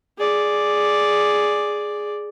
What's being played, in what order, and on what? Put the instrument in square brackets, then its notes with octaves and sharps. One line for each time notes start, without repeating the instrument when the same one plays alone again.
[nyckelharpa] G#4 D5